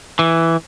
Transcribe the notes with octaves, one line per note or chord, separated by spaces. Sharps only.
E3